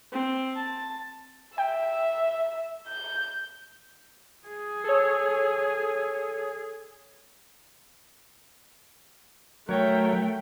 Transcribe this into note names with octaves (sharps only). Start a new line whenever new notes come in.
C4
A5
E5 G5
G6
G#4
A4 C#5
F#3 A3 A#4 C#5 G5